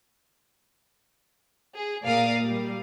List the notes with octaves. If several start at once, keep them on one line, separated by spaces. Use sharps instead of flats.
G#4
A#2 A#4 D5 F5 D#6
G3